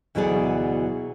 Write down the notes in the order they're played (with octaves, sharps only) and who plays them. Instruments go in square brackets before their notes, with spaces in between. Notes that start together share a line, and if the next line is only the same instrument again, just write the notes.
[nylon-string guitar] D2 B2 E3 F#3 G#4 D5